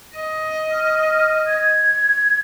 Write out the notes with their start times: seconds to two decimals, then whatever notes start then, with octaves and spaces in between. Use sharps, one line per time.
0.16 D#5
0.71 F6
1.46 G#6